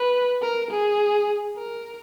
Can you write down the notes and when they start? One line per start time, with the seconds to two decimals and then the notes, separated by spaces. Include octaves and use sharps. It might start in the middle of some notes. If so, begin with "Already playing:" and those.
Already playing: B4
0.42 A#4
0.71 G#4
1.57 A#4